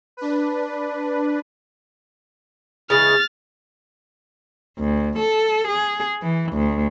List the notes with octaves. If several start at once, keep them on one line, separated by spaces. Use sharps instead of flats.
D4 B4
C#3 E3 G#3 F6 A6
D2
A4
G#4
E3
D2